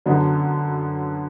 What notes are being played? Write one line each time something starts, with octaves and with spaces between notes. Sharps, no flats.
F#2 D3 F#3 B3